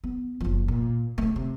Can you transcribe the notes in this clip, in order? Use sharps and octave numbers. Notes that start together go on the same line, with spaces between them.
B3
F#1 F3
A#2
C#3 A3
C3